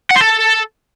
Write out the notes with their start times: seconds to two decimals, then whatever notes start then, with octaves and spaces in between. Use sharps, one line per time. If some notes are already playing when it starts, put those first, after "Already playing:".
0.11 F#5
0.16 C5
0.21 A4